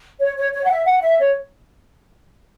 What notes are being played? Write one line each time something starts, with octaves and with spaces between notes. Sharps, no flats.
C#5
C#5
C#5
F#5
E5
F#5
E5
C#5